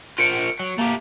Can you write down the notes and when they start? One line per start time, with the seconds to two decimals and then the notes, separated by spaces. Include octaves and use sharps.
0.18 F4 A#4 C5 C#7 D7
0.59 F#3
0.78 A3 A#3 G4